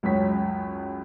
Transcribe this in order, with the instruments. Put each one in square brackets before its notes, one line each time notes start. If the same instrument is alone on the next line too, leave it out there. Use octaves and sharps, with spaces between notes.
[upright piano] C#2 F#2 G#3 C#5 B6